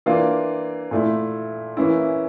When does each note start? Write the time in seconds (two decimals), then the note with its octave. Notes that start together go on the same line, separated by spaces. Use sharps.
0.06 E3 A#3 D4 F4
0.91 A#2 A3 E4
1.77 E3 A#3 C#4 E4